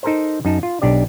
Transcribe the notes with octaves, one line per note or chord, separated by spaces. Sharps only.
D#4 A4 A#4 C5
F#2 D#4 A5
F4
B1 D4 G4 D5